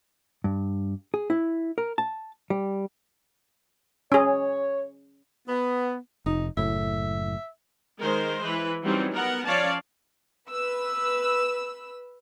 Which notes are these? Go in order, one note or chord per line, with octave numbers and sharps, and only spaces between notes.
G2
G#4
E4
A#4
A5
G3
C#4 G#4 C#5
B3
F1 D#4
F#1 A2 E5
D#3 G#3 A#4 C5
E3 B4
E3 F#3 G3 C4 C#4 D#4
B3 A#4 F#5
F3 C#4 C#5 D5 F5 A5
B4 E6